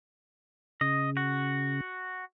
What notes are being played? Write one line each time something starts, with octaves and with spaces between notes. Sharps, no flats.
C#3 D#5
F#4